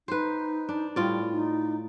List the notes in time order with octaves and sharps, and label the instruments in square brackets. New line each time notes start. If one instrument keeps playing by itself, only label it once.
[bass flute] D#4 [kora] B4 C5
[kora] D4
[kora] A2 F4 D5 [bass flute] G3
[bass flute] D#4